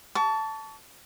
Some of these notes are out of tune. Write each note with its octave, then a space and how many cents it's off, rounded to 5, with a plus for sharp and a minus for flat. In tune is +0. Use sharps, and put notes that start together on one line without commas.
A5 +0 C#6 +40